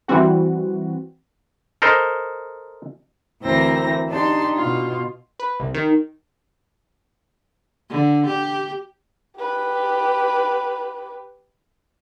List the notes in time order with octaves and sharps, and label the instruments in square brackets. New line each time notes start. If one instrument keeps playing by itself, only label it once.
[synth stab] E3 G3 C4 F#4
[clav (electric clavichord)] A4 A#4 C5 D#5
[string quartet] D2 E3 C4 A#4 A#6
D4 D#4 G4 A5 C6
B2 F4
[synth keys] B4
C2
D#3
[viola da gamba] D3
G4
[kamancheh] G4 B4